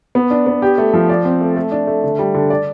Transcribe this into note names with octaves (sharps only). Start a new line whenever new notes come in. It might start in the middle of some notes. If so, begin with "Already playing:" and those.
B3
D4
B3
G4
A3
F3
D5
C4
A3
A3
D4
A3
D3
G3
D3
D5